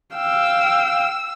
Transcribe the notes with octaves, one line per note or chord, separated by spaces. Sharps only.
F5 G5 E6